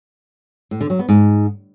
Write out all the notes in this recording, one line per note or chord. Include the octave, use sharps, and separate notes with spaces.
A2
D3
F#3
B3
G#2